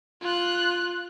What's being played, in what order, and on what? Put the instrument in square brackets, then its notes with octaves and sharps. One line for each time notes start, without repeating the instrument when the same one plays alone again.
[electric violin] F4 F#6